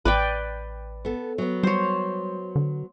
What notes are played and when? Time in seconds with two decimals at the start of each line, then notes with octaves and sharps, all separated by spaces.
0.05 A1 B4 D5 G5
1.05 B3 A4
1.38 F#3 B3
1.63 G3 C5 C#5
2.56 D3